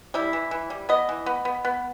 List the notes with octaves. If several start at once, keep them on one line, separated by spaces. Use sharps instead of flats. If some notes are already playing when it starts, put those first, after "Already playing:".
G3 E4
E3
E3
G3
B3 D#5
E3
B3
B3
B3